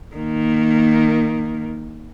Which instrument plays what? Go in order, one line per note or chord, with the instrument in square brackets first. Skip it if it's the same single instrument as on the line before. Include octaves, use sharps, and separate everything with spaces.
[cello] D#3 A#3